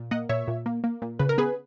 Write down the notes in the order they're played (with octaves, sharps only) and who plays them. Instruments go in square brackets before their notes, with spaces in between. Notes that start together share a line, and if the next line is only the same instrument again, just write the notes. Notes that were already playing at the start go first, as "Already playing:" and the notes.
Already playing: [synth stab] A#2
A#3 D#5 F#5
A#2 C#5 E5
A#2
A#3
A#3
A#2
C#3 B4
A#4
B3 G#4 B4